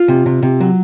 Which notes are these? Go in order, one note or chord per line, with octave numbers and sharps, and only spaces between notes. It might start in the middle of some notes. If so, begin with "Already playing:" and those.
Already playing: F4
C3
C3
C3
F#3